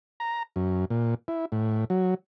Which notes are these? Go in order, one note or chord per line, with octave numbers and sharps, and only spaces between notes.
A#5
F#2
A#2
E4
A2
F#3